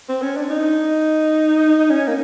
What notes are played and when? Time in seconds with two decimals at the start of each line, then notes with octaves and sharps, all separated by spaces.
0.09 C4
0.22 C#4
0.37 D4
0.50 D#4
1.91 C#4
2.07 A#3